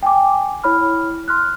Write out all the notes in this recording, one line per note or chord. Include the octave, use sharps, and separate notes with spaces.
G5 G#5 D6
E4 C#5 B5 F6
C6 F6 F#6